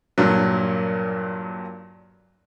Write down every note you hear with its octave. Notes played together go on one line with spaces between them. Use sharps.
G2 A#2 F#3